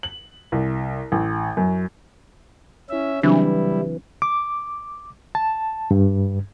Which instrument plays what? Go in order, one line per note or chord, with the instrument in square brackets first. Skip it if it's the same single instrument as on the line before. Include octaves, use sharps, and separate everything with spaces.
[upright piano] F#7
C2
A1
F#2
[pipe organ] C#4 E5 [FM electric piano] E4 E6
[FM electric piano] C#3 F#3 C4 [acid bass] E3 [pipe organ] G3 E4 [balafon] D4
[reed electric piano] D6
A5
G2